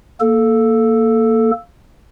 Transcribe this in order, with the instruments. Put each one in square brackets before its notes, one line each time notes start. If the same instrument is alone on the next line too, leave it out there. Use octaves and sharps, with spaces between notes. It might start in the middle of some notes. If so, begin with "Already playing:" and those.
[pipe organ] A#3 A4